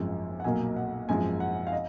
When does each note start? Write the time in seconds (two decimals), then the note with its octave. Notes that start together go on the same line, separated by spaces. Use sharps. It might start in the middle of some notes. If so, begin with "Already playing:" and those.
Already playing: G#1 F#2 F3 G#3
0.40 F#5
0.44 B1 A#2 F#3 A#3 G#5
0.76 F#5
1.09 G#1 F#2 F3 G#3 G#5
1.40 F#5
1.67 F5
1.73 D#5